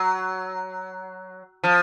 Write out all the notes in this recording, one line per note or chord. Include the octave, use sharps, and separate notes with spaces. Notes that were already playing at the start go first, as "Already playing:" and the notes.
Already playing: F#3
F3